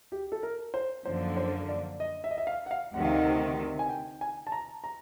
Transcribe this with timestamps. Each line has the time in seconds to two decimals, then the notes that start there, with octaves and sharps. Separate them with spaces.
0.12 G4
0.32 A4
0.43 A#4
0.74 C5
1.06 F#2 D3 F3 A#3 C5
1.37 C5
1.69 D5
2.00 D#5
2.24 E5
2.31 D#5
2.38 E5
2.47 F5
2.66 F#5
2.71 F5
2.94 D2 C3 D#3 F#5
3.05 F5
3.16 F#5
3.79 G#5
3.89 G5
4.21 G#5
4.47 A5
4.52 A#5
4.84 A#5